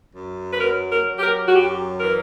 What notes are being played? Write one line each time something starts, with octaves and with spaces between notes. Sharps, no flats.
F#2
B4
F#3 A#4
A#4
F#3
G4
A#4
F#4
F#2 G4
E3 A#4